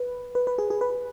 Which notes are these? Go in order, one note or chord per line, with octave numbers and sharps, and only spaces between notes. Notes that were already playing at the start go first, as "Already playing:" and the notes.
Already playing: B4
B4
B4
G#4
G#4
B4